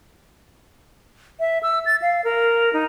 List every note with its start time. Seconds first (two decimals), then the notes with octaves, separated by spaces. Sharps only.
1.40 E5
1.63 E6
1.86 A6
2.02 F5
2.24 A#4
2.73 D#4